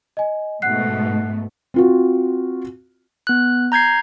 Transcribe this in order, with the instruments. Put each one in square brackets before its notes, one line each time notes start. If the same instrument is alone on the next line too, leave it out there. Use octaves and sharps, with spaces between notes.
[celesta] D#5 G#5
[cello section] G#2 B2 A3 [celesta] F#5 F#6 C7
[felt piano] C4 F4 F#4
[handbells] B3 F#6
A#5 G6 G#6 C7